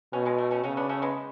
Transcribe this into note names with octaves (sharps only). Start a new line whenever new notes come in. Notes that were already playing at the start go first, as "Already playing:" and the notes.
B2 A3 C#4
G#3 B3
A3
A3 C#4
C#3 A3 C#4
B3 D4
A3 C#4
G#3 B3